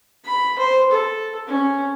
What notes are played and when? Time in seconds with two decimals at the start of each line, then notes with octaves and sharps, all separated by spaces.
0.25 B5
0.59 C5
0.91 A4
1.47 C#4